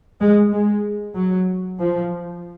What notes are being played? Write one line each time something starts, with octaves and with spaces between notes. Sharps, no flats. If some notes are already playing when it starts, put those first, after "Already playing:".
G#3
G#3
F#3
F3